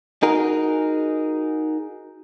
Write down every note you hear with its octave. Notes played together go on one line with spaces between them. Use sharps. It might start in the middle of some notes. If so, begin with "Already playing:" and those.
D#4 F#4 G#4 A#4